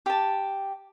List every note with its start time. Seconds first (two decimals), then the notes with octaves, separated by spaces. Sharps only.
0.06 G4 A5